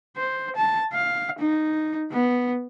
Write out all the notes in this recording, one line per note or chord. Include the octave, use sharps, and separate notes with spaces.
C5
A5
F5
D#4
B3